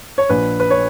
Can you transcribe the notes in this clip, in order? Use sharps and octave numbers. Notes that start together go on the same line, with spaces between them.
C#5
A#1 B4
B4
C#5